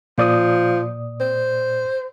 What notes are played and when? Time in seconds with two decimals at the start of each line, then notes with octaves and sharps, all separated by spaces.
0.18 A#2 F3 D5 D#6
1.21 C5